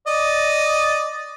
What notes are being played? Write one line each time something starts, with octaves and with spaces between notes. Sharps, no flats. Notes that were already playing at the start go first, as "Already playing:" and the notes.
D5 D#5